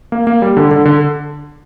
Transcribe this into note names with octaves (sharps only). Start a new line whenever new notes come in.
A#3
A#3
G3
D3
D3
D3